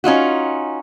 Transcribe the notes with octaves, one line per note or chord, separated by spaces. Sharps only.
C#4 D#4 F4 F#4